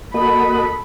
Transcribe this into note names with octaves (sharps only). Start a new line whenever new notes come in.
A#3 F#4 A4 D#5 B5